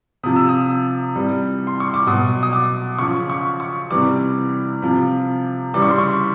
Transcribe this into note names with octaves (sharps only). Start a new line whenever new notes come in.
C3 F3 D#6
E6
D#6
C3 E3 G3
C6
C#6
D6
B2 F#3 D#6
D#6
D6
C#3 F3 C#6
C#6
C#6
C3 E3 G3 D6
C3 F3
C#3 E3 G3 D6
C#6
C6
C#6